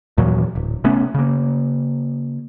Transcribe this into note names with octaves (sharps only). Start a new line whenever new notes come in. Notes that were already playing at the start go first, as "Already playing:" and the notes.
D#2 A#2 E3 F#3
D1
C3 A3 B3 C#4
C#3 A#3